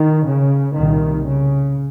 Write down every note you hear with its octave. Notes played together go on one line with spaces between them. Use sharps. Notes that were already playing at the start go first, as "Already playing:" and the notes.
Already playing: D#3
C#3
C2 A#2 D#3
C#3